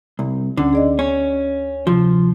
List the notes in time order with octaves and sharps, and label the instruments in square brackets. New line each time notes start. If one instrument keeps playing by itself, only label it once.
[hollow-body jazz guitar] C2
[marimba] D2 C#4 F#5 [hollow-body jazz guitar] D3
[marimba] G#4 D5 D#5
[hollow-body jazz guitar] C#4
[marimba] C3 [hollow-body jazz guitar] F3